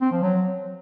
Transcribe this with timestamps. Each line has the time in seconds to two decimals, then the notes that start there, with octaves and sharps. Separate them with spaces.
0.01 C4
0.12 F3
0.22 F#3